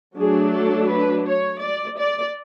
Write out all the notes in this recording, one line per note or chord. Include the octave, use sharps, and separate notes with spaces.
F#3 A3 D4 G#4
A4
B4
C#5
D5
D5